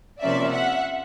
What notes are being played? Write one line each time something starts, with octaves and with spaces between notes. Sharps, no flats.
C3 F3 A#3 C#4 D5 E5
E5 F#5